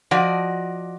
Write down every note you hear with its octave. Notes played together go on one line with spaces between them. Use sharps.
F3 F#4 D5 D#5